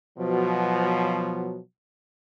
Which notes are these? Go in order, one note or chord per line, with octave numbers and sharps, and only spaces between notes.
B2 F3 F#3